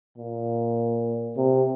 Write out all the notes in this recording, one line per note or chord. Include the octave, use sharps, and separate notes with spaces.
A#2
C3